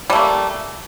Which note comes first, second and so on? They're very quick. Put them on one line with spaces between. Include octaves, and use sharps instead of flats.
G3 A3 A#3